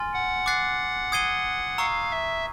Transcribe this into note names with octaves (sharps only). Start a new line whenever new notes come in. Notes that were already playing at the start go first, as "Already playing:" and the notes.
Already playing: G#5 C6 F6 A6
F#5
D6 F#6 A6 C7
D#6 G#6 C7 D#7 G7
F5 A#5 C#6 E6
E5